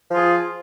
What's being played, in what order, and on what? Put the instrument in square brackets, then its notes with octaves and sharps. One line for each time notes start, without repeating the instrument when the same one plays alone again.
[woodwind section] F3
F4
G#4